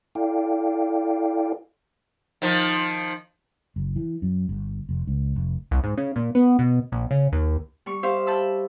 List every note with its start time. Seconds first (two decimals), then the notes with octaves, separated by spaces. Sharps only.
0.15 E4 A4 D5 F5 G5
2.42 D#3 F3
3.76 F#1
3.96 E3
4.22 F#2
4.49 G1
4.89 F1
5.07 C#2
5.36 F1
5.71 C2
5.84 G#2
5.97 C#3
6.16 A#2
6.35 B3
6.59 B2
6.92 A#1
7.11 C#3
7.32 D#2
7.86 G3 C#6
8.03 G4 C5 E5 F5
8.27 G5 A5 B5 E6